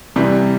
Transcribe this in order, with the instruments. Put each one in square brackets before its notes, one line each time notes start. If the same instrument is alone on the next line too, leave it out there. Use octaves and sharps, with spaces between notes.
[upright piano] C3 E3 G3